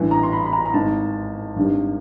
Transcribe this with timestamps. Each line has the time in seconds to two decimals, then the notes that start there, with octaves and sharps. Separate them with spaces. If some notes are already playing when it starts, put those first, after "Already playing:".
Already playing: A1 G2 E3
0.11 A#5
0.23 C6
0.33 B5
0.46 B5
0.53 A#5
0.66 A#5
0.74 G#1 G#2 D#3 A5
1.56 G#1 G2 D#3 G3